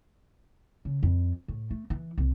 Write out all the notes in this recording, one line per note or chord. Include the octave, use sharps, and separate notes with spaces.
C#3
F2
A2
A3
E3
C2